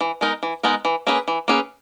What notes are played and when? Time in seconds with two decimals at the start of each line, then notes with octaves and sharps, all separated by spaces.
0.01 E3
0.21 G#3 B3 D#4 A#4
0.43 E3
0.63 G#3 B3 D#4 A#4
0.85 E3
1.07 A#3 C#4 G#4 B4
1.28 E3
1.48 A#3 C#4 G#4 B4